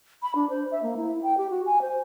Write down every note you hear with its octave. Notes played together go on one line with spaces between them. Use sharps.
B5
D4
C5
E5
A#3
E4
G5
G4
F#4
G#5
C5